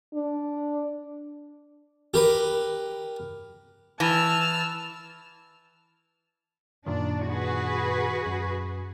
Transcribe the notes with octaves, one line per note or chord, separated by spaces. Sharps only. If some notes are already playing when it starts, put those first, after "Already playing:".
D4
G4 A#4 B4
E3 A5 E6 F6
F#2 A#2 D#3 D4
F#4 G#4 B4
F#2